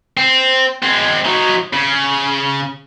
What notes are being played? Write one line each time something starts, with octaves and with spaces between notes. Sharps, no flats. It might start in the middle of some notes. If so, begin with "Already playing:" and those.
C4
G#3 C4
F#3 D#4
C#3